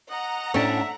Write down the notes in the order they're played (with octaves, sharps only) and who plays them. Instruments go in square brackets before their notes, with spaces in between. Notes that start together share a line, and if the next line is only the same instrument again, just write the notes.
[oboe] D#5 [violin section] F#5 A#5
[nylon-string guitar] A2 D4 A5 [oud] C#4 [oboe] E5